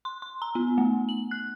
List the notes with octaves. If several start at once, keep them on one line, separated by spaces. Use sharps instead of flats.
C6
C6
A#5
B3
A3
F#7
F#6